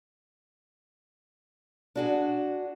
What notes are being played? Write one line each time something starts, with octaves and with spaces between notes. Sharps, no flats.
D4 F#4 G#4